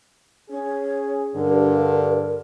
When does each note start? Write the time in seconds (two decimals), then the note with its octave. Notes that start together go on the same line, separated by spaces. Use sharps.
0.50 C#4 G#4 C#5
1.36 G2 D3 A#4